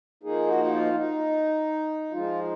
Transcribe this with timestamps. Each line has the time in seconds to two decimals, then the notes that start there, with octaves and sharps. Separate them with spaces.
0.23 F3 A#3 D#4 G#4
0.47 F#4
0.65 F#4
0.71 F4
0.95 D#4
2.12 F3 G#3 D#4 F4